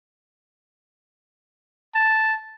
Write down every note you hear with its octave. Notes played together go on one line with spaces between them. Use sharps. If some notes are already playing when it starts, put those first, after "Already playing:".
A5